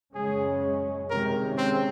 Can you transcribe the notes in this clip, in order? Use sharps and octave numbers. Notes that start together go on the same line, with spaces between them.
F#2 C#3 G#3 C#4 G#4
C3 D#3 G#3 C#4 A#4
C4